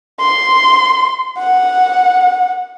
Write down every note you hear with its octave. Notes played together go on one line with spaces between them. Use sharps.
C6
F#5